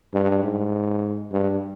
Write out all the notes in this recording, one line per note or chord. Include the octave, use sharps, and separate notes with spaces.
G2
G#2
G2